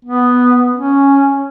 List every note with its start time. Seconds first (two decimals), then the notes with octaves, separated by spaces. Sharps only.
0.05 B3
0.76 C#4